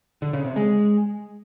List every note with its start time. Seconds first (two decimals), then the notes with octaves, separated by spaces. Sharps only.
0.22 D3
0.33 C#3
0.45 C3
0.56 G#3